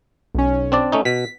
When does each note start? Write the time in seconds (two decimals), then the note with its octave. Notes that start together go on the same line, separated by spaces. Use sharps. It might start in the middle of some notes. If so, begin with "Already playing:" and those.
0.35 B1 C#4
0.72 C4 D4 D5
0.92 A3 C#4 D#4
1.05 B2 B6